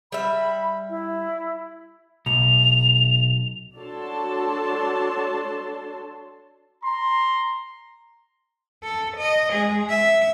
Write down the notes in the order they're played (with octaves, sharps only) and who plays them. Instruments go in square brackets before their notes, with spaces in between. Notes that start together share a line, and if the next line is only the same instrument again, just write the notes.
[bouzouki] G3 E5 [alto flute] B5
[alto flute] E4
[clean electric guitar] B1 [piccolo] F7
[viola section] D4 F#4 A4 C#5 A5 C6
[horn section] A#5 C6
[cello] A4
D#5
G#3 G#4
E5